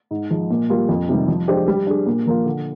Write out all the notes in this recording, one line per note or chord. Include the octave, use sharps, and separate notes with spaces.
G#2
F3 G#3
A#2
G3 A#3 F4
F2
C3 D#3 G3
F3
G#3 D4 G4 C5
G3
D4 G#4
A#2
F3 A#3 F4
D3